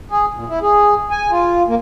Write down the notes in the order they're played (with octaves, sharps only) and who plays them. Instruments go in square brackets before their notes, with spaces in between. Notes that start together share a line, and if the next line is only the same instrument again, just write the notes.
[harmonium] G#4
A#2
E4
G#4
G#5
F4
A#3